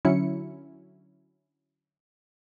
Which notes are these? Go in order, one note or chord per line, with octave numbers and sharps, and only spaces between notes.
D3 F#3 C#4 E4 C#7